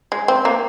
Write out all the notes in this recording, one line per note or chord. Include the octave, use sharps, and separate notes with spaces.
G#3
C4
A#3